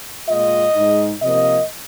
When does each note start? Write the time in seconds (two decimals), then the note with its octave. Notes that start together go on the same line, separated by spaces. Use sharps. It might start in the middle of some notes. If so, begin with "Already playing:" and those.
0.29 A#2 G#3 F4 D#5
0.76 G#2 G#3 D#4
1.22 C3 F3 A#3 D#5